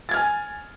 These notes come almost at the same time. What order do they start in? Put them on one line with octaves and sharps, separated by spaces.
A6 G#6 F6 G#5